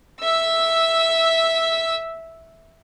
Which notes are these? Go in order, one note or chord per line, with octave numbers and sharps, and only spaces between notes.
E5 E6